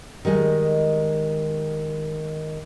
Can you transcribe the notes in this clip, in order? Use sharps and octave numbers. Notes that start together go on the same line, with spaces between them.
D#3 G3 G#3 D#5